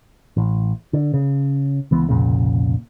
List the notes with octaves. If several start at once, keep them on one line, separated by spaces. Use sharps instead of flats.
A1
D3
C#3
C#2 E3 B3
C2 F2 A#2 C#3